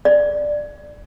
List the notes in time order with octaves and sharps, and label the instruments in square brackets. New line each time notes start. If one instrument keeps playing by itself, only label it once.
[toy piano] D5